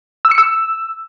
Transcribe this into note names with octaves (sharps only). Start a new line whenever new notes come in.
E6
C#7
E6